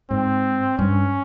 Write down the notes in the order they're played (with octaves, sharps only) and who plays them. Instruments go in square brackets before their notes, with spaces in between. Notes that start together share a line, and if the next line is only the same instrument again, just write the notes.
[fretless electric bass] G#2 [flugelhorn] C4
[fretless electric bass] G2 [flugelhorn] C#4